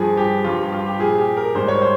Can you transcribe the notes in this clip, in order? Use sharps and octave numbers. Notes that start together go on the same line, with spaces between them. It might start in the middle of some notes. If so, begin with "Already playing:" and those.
Already playing: G2 F3 G#4
G4
G2 F3 F4
G4
F4
G4
A#2 F3 G#4
G4
A#4
G#2 G3 C5
C#5
C5